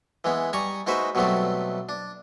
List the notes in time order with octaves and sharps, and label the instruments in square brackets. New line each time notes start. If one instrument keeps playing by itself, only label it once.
[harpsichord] E3 G#3 B3
G3 G#5 A#5 C#6 D#6
G#3 D#4 F#4 B4 C5 E5
B2 F#3 G3 A3 B3 C4
D4